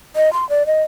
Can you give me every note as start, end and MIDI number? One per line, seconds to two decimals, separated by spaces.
0.16 0.32 75
0.33 0.47 84
0.49 0.66 74
0.67 0.83 75